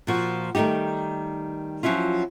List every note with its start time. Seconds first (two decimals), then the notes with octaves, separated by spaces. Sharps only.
0.07 A#2 F3 F#4
0.55 D#3 G3 A3 D#4 G4
1.83 F3 F#3 C#4 E4 F4